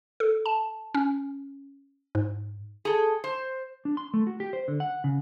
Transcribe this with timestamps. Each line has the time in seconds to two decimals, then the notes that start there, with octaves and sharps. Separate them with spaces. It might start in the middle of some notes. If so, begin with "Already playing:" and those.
0.20 A4
0.46 A5
0.94 C#4
2.15 G#2
2.85 G#4 A4
3.24 C5
3.85 D4
3.97 C6
4.14 A3
4.27 F#4
4.40 G4
4.53 C5
4.68 D3
4.80 F#5
5.04 C#3